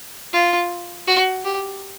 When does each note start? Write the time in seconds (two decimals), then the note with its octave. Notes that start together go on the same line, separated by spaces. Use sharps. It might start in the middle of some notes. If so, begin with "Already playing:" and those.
0.33 F4
1.07 F#4
1.44 G4